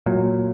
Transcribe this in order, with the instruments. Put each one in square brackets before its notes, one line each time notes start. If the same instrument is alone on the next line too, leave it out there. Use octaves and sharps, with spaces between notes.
[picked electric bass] A#2 F#3